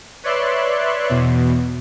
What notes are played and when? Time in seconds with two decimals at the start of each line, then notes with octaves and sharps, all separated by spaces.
0.23 B4 C#5 D5 E5 C6 F#6
1.09 E2 B2